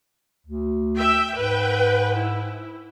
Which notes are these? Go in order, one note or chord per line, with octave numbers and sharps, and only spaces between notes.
D2
E5 G5
G#2 B4 G5
E4